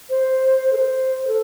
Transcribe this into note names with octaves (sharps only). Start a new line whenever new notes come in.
C5
A4
C5
A4